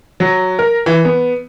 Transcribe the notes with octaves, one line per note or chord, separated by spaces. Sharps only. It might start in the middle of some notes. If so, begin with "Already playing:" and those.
F#3
A#4
E3
B3